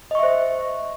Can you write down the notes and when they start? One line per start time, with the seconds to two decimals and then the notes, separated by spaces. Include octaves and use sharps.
0.11 D#5
0.15 C#6
0.19 E5
0.23 C5